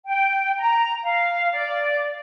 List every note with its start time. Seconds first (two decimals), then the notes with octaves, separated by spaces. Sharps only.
0.05 G5
0.58 A#5
1.04 F5
1.53 D5